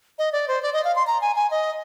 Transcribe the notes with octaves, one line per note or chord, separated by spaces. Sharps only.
D#5
D5
C5
D5
D#5
F5
C6
A#5
G#5
G#5
D#5